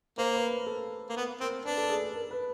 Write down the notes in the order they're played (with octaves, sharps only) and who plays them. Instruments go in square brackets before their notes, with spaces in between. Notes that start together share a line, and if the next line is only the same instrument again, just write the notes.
[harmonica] A#3 [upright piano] C5
[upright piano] B4
A#4
A4
[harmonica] A#3
[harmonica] B3 [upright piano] A#4
[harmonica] C4 [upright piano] A#4
[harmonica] D4 [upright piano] B4
[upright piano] A4
G#4
G#4
A#4
B4